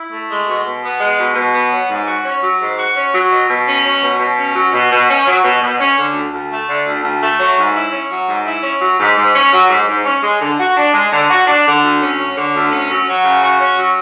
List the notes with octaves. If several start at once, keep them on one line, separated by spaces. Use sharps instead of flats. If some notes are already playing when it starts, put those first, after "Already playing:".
Already playing: E4
A3
G#3
B2
B2
B3
G#3
B2
B2
B3
F#3
G#2
F#4
C#4
F#3
G#2
F#4
C#4
F#3
B2
B2
C#4
F#3
B2
B2
C#4
F#3
B2
B2
C#4
F#3
B2
B2
C#4
D3
D2
D2
A3
D3
D2
D2
A3
F#3
G#2
E4
C#4
F#3
G#2
E4
C#4
F#3
G#2
G#2
C#4
F#3
G#2
G#2
C#4
G#3
D3
F#4
D4
G#3
D3
F#4
D4
D3
D2
C#4
F#3
D3
D2
C#4
F#3
F#3
C#3
F#4
C#4
F#3